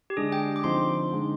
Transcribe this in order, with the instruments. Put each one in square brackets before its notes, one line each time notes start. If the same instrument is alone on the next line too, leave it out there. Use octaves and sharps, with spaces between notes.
[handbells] G4
[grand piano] D3 G#3 D4 [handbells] G#4
[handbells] G5
D6
[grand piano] D3 F3 C4 D#4 [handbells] C6
[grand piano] D3 G#3 D#4